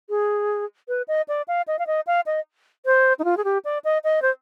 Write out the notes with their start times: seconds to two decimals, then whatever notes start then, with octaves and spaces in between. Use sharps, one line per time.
0.09 G#4
0.88 B4
1.08 D#5
1.28 D5
1.48 F5
1.68 D#5
1.79 F5
1.87 D#5
2.07 F5
2.26 D#5
2.86 C5
3.19 D#4
3.24 F4
3.37 G#4
3.44 G4
3.65 D5
3.84 D#5
4.04 D#5
4.22 C5